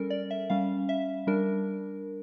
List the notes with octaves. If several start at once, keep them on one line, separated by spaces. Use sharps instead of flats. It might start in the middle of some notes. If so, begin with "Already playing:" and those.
Already playing: G3 C#4 A4 A#4
D5
E5
G3 C#4 F5
E5
G3 D4 A#4